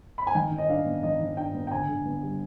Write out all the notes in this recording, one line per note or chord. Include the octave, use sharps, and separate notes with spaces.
B5
G#5
D#3 G5
D#3
D#5
D4 F5
B3
D#3 D#5
D#3
D4 G5
B3
G5
D3 G#5
D3
B3
G3